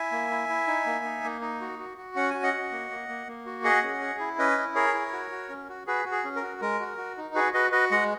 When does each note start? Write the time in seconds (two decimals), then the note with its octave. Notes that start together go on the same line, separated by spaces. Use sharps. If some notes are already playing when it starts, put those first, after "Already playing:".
Already playing: E4 E5 G#5
0.11 A#3
0.31 E4
0.49 E4
0.67 D#4
0.86 A#3
1.05 D#4
1.24 A#3
1.41 D#4
1.61 F#4
1.79 F#4
1.98 F#4
2.16 C#4 F#5
2.30 F#4 G#5
2.43 D#5 F#5
2.54 F#4
2.71 A#3
2.91 A#3
3.09 A#3
3.27 A#3
3.46 F#4
3.64 G#4 D#5 F#5
3.83 C#4
4.01 G#4
4.20 E4
4.38 C#4 B4 D#5
4.57 E4
4.75 G#4 A#4 C#5
4.94 E4
5.13 F#4
5.31 F#4
5.49 C#4
5.69 F#4
5.87 F#4 G#4 B4
6.05 F#4
6.12 G#4
6.24 C#4
6.36 A#4
6.42 F#4
6.61 G#3 A#4
6.80 F#4
6.97 F#4
7.17 D#4
7.35 F#4 G#4 B4
7.53 F#4 B4 D#5
7.72 F#4 B4 D#5
7.91 G#3 D#5 F#5